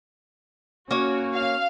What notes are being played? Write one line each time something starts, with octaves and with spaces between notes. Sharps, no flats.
A#3 C#4 F#4 C#5
F5